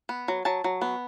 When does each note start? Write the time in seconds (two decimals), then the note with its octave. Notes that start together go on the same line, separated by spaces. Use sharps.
0.09 B3
0.28 F#3
0.45 F#3 A5
0.64 F#3
0.82 B3